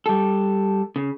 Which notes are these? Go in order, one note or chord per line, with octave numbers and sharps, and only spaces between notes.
G3 A4
C#3